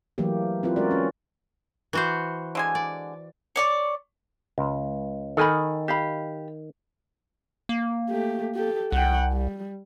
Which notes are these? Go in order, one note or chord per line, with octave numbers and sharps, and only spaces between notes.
E3 F#3 A3 A#3 G4
C4 E4 F4 B4
G#3 C#4 F#4 A#4 D5
C#4
E3 F#4 C5
D3 G#3 G#5
D5
C#5 D5 C#6
C#2
D#3 A4 G#5 B5
G4 F5 B5
A#3
A3 G4
G4 A4
C2 F#5 G5
G3